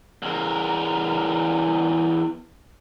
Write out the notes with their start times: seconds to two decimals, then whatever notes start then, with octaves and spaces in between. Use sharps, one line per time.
0.22 E2 A#4